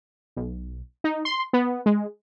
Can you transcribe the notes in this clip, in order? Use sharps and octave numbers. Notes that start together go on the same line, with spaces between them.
B1
D#4
C6
B3
G#3